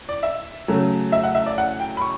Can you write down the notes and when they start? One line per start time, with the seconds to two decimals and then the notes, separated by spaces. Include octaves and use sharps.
0.09 D5
0.23 E5
0.68 C#3 F#3 A3
1.12 E5
1.23 F#5
1.35 E5
1.46 D5
1.58 F#5
1.80 G5
1.97 B5
2.01 C#6